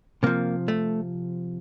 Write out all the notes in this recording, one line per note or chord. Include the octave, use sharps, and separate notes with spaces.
C3 F3 A#3
A3